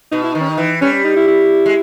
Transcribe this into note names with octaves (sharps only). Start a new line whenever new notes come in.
B2 D#4
E4
D#3 D#4
C#4
D#4
E3
G3 C#4
C#4
D#4
E4
E4
G#3